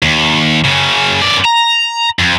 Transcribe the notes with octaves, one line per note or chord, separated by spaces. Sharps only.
D#2
F#2 C#3
F#2 D5
A#5
F2